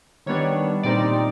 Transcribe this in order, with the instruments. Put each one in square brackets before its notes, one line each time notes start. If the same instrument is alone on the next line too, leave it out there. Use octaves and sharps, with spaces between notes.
[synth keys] D#3 G3 B3 D4 C#5
A#2 G3 C4 D#4 D5